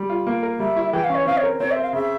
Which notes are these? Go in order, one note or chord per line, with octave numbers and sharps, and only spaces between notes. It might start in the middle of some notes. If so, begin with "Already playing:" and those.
Already playing: G3
F4
A#3
A#4
G3 E5
E4
E3 G5
F5
C#4
C#5
C4 F5
C#5
A#4
C4 C#5
E5
C5
F5
C#3 E5